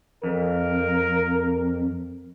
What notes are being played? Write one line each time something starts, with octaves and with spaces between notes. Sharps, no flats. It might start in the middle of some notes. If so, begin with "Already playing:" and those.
F2 A#4